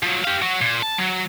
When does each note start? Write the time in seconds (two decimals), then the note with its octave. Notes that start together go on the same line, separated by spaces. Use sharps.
0.03 F3 F#3
0.25 G4 F5
0.42 F#3 F#4
0.61 A#2
0.82 A5
0.98 F#3